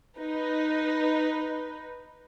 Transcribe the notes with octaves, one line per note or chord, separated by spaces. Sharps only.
D#4 B4